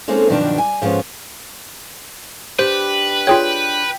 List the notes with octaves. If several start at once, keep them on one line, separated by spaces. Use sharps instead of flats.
G#3 A#3 C4 C#4 D#4 A4
G2 B2 D#3 F3 F#3 D4
G#5
G#2 F3 B3 C#4
D4 G4 B4 C5
F4 G#4 C#5 G5